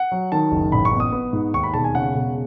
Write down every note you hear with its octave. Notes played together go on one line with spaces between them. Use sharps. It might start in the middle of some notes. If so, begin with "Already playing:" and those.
Already playing: F#5
F#3
D#3 A5
F#1
A1 B5
C#6
B3
D#6
B3
G#2
D#2 C#6
B5
E1 A5
G#5
C#3 F#5
E1